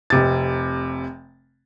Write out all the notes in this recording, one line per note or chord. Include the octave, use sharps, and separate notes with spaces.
F1 C3 A6